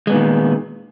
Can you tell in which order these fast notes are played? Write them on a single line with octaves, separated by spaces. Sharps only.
G#3 B3 A#2 D#3